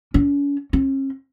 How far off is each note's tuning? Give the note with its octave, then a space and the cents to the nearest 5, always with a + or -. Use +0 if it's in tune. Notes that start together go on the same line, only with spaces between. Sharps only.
C#4 +40
C#4 -45